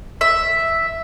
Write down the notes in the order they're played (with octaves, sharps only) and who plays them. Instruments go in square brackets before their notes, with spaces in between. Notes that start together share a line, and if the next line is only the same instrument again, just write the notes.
[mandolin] E5